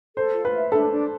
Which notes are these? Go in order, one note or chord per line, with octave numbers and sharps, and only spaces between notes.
A4 C5
F4
B4
E5
D4 A4
D4